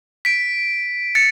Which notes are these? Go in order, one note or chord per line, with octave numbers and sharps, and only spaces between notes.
B6 D7
A6 C#7